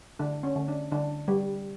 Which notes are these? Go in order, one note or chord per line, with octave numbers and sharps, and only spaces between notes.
D3 D4
C#4
D3
D4
D3 D4
G3